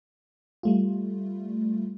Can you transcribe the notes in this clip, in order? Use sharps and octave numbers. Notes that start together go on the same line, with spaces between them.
G3 A3 F4